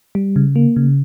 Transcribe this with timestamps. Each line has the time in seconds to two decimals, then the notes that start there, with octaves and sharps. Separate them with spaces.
0.15 G3
0.36 C#3
0.56 A#3
0.76 C#3